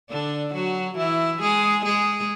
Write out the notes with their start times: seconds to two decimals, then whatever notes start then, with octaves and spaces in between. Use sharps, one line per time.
0.10 D3 D4
0.54 F#3 F#4
0.97 E3 E4
1.42 G#3 G#4
1.85 G#3 G#4